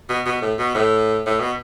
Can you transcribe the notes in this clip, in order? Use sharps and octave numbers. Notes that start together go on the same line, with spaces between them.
B2
B2
A2
B2
A2
A2
B2